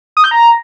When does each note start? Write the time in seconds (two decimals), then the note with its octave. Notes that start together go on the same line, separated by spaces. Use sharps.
0.17 D#6
0.24 G6
0.31 A#5